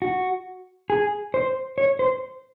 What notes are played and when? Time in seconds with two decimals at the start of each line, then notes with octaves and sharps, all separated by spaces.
0.02 F#4
0.90 G#4
1.34 C5
1.78 C#5
1.99 C5